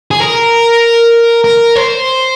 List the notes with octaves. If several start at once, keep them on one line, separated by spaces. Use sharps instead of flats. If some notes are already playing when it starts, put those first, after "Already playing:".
G#4
A#4
A#4
C5